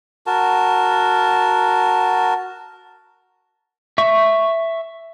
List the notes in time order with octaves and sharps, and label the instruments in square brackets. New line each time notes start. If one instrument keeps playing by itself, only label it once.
[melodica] F#4 A#4 A5
[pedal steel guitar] E5 C#6